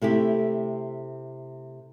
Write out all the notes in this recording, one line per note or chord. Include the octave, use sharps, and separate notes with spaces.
C3 A3 E4 G4